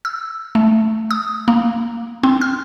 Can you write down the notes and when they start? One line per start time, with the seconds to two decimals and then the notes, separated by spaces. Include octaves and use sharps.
0.05 E6
0.55 A3
1.11 D#6
1.48 A#3
2.23 C4
2.41 F6